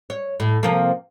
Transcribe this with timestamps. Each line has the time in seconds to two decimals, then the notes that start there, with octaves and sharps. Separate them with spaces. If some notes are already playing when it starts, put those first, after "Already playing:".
0.10 C#5
0.40 A2
0.63 C3 F3 A#3